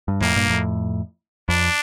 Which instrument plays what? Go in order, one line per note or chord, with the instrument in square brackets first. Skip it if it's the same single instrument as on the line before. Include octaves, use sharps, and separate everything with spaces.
[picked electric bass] G2
[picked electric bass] F2 A2 [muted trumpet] A#3
[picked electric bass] G2 A#2
F2 A2
[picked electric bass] F2 [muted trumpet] D4